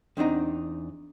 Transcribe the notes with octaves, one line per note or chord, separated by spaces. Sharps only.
E2 C4 D4 D#4 A#5